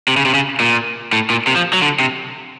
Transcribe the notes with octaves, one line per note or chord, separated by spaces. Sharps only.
C3
C#3
C3
C#3
A#2
A2
A#2
C3
F3
F#3
D3
C3